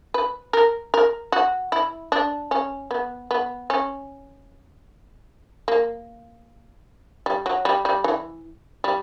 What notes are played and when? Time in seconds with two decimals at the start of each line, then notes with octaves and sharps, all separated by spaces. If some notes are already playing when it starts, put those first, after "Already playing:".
0.14 B4
0.53 A#4
0.94 A#4
1.32 F#4
1.72 E4
2.12 D4
2.51 C#4
2.91 B3
3.31 B3
3.70 C#4
5.68 A#3
7.26 G3
7.46 F#3
7.65 G3
7.85 G3
8.04 E3
8.84 G3